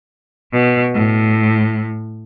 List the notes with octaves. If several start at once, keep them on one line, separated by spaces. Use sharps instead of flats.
B2
A2